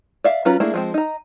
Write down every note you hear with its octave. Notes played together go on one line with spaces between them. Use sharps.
D5 E5 F5
F#3 C#4 F4 B4 A#5
A3 A#3 D4 E4 G#4
F3 G#3 C4
D#4 A#5